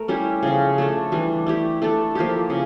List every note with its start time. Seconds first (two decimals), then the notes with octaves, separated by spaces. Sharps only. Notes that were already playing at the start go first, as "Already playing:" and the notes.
Already playing: A3 A#4
0.08 G3 C#4 E4 G4
0.43 C#3 F3 C#4
0.78 A3 D4 A4
1.12 E3 G3 D4
1.47 A3 E4 G4
1.82 A3 D4 A4
2.15 F3 A#3 E4 G4
2.50 C#3